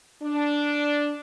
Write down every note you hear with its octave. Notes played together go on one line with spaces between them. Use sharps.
D4